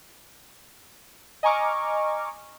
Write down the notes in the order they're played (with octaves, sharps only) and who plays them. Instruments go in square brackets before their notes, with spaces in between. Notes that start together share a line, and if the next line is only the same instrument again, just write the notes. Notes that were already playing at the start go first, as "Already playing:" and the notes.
[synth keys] D#5 G#5 A#5 C#6 D6 F6